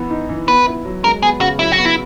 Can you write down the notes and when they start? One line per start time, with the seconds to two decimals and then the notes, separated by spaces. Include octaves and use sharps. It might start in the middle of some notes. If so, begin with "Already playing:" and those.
Already playing: E3 B3
0.10 D#4
0.29 E3
0.48 B3 B4
0.66 E4
0.85 F#3
1.04 G#3 A#4
1.22 B3 G#4
1.41 C#3 F#4
1.59 F#3 E4
1.72 F#4
1.78 B3
1.85 E4